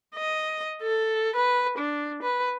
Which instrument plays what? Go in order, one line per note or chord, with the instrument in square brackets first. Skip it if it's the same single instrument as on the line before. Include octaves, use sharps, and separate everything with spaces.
[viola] D#5
A4
B4
D4
B4